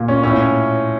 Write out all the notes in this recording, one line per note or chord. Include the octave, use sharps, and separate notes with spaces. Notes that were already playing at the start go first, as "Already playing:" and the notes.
Already playing: A#2
C#4
A2 C#4